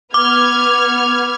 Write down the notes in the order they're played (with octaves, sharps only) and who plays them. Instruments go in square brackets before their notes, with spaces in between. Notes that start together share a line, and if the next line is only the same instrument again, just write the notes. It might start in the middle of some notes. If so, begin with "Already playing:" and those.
[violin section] B3 F6 G#6 [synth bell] D6